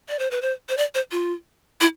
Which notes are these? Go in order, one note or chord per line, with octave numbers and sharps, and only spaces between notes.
D5
C5
B4
C5
C5
D5
C5
F4
E4